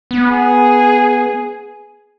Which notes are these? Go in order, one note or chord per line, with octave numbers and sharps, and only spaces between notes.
B3
G#4